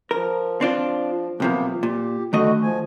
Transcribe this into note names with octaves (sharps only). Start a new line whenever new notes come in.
F3 A#4
C4 D4 F4
B1 C3 F3 A#3 B3
A#2 G4
D3 D#3 A3 F#4 D#5
F3 G#5